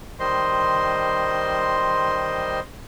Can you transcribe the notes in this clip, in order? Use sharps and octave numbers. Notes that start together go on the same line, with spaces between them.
D#3 G3 C5 D#5 C6